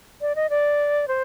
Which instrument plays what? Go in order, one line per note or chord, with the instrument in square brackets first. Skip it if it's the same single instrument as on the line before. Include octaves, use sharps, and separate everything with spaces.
[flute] D5
D#5
D5
C5